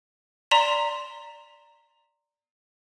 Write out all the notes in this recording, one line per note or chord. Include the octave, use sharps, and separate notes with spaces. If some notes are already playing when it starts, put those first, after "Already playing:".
D5 A#5 C6 B6 E7